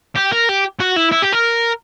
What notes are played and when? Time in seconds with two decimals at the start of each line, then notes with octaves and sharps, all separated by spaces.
0.16 G4
0.32 A#4
0.49 G4
0.80 F#4
0.96 E4
1.12 E4
1.23 G4
1.33 A#4